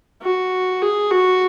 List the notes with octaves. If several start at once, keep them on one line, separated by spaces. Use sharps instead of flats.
F#4
G#4
F#4